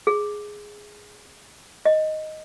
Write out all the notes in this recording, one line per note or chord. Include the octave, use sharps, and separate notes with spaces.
G#4
D#5